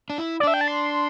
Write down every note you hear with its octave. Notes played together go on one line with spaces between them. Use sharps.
D4
E4
D5
D4 E5
G5
A5
C6